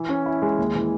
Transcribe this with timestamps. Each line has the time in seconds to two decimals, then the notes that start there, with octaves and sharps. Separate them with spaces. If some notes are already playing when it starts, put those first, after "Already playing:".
Already playing: E3
0.09 C#4
0.26 E4
0.42 G#3
0.58 D#2
0.75 E3